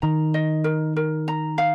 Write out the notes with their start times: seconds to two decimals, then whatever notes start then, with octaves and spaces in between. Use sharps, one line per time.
0.02 D#3 A#5
0.34 D#5
0.64 A#4
0.96 A#4
1.28 A#5
1.58 F5